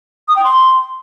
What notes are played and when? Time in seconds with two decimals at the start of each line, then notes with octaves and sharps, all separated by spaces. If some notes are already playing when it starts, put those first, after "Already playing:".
0.28 D#6
0.36 G5
0.44 C6